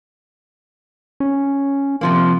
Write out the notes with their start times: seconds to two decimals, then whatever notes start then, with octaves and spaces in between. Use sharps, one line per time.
1.20 C#4
2.01 C3 F3 A#3